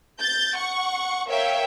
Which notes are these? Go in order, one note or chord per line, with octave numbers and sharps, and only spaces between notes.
G6 A6
F#5 C#6
A#4 C#5 E5 F5 G5